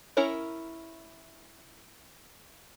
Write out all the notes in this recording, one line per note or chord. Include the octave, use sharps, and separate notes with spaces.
C#4 E4 A#4 C#5